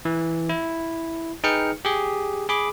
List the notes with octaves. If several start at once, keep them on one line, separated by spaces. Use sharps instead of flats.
E3
E4
D#4 G#4 B4 G5 F6 C#7
G4 G#4
G#4 B5 D6